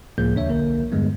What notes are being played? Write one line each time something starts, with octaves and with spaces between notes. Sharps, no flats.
C#2 A2 F3 A#3 G#4 G6
D#2 C#3 D4 C#5 E5
B1 D3 A#3 A#4
E2 G2 D3 G3 G#3 B3